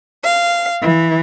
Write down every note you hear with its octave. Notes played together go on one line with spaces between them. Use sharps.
F5
E3